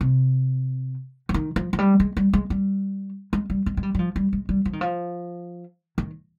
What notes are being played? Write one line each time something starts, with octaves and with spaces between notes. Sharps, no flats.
C3
F3
D#3
F3
F3
G3
G#3
G3
G#3
G3
G#3
G3
G#3
G#3
G3
G3
F3
G3
G#3
G3
F3
D#3
F3
D#3